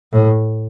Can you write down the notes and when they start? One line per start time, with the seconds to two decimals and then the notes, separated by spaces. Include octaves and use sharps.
0.13 A2